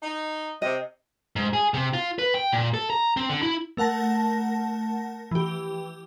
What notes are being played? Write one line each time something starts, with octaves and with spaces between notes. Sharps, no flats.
D#4
C3 D#5
G#2
G#4
C3
F4
B4
G5
A#2
A4
A#5
C4
D3
E4
A3 A#4 F#5 A5 A#6
E3 G4